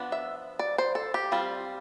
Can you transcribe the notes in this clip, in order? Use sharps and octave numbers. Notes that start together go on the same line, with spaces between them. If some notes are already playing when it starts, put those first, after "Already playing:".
Already playing: F3 B3 D4
E5
D5
C5
A4
G4
G3 C4 F4